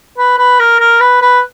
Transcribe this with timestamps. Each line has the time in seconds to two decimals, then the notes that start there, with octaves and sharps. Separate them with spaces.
0.18 B4
0.38 B4
0.59 A#4
0.80 A#4
1.01 B4
1.22 B4